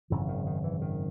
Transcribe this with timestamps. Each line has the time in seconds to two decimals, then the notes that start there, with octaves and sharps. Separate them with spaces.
0.10 G#1 F#2 C#3 E3
0.29 D#3
0.46 D#3
0.64 E3
0.82 D#3